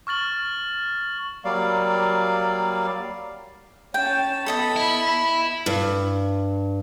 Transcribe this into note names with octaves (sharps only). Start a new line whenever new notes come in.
C#6 F6 A6 F#7
F#3 G3 A#3 D5 F5
C#4 G5 A5
B3 A4 D#5 A5 B5
E4
G2